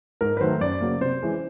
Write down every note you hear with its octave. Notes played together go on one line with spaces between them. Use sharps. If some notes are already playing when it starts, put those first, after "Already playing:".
G#2 A#4
B4
D#3 F#3 A3 C5
F#2 D5
C#3 F#3 A#3
C3 C5
E3 G#3 C#4